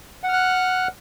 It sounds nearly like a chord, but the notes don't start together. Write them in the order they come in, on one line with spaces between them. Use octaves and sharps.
F#5 F6 F#6